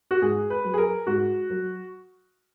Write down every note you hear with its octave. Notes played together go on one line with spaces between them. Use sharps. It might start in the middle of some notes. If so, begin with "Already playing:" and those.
F#4
G#2 G#4
B4
F#3
G#4
A#4
G#2 F#4
F#3